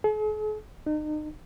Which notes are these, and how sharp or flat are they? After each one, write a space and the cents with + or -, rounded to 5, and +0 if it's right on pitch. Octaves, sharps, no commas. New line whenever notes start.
G#4 +45
D#4 -35